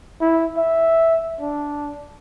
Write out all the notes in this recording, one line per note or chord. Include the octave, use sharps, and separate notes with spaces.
E4
E5
D4